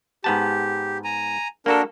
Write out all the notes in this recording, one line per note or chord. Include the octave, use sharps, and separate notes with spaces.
G#2 B3 G4 A5
G#5 A#5
A#3 D4 F#4 A4 A#4